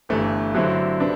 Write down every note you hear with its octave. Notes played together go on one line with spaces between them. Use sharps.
G1 G2 E3 A3
G2 D3 F#3 C4 E4
C3 B3 D4